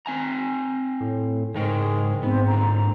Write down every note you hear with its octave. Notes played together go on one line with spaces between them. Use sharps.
C4 G#5 A#5
A2
G#2 C#3 G#3 A#4 G5
G#2 B3 C4
A#2 D3 A#5